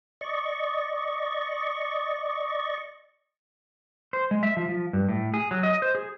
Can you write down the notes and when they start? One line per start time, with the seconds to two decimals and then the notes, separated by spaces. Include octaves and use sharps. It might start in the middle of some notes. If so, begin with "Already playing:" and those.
0.21 D5 D#5 C#6
4.13 C5
4.31 G#3
4.43 E5
4.57 F3
4.69 F3
4.93 G2
5.09 A2
5.34 G#4
5.51 F#3
5.63 D#5
5.82 C5
5.95 G#4